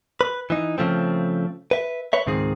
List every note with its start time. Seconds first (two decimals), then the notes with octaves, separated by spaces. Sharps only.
0.21 B4
0.50 E3 D#4
0.78 C#3 F3 A3 C4
1.71 B4 E5
2.13 B4 C#5 E5
2.27 C#2 G#2 D#3 C4 G#4